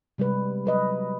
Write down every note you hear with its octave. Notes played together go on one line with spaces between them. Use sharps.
C3 G3 G#3 B4
F#3 B4 D#5